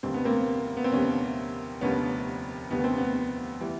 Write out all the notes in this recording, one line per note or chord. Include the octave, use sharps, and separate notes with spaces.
F1 D#2 D3 G3 C4
B3
A#3 C4
B3
C4
F1 D#2 D3 G3 B3 C#4
F1 D#2 D3 G3 B3 C#4
F1 D#2 D3 G3 B3
C4
B3
E3 G3